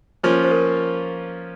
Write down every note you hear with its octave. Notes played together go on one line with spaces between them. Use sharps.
F3 A#3 C#4 F4 C5
C5
A#4